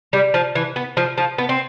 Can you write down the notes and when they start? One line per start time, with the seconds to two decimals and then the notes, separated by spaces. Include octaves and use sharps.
0.13 G3
0.34 F3
0.55 E3
0.76 B3
0.97 F3
1.18 F3
1.38 B3
1.49 C4